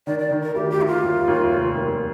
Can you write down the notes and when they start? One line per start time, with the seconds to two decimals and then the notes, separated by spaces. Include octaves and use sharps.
0.07 D#3 D5
0.19 D5
0.31 D#3
0.43 A#4
0.55 D2 G4
0.70 G4
0.79 D2 D#4
0.87 F4
1.03 D#2
1.28 D#2
1.52 F1
1.75 D#2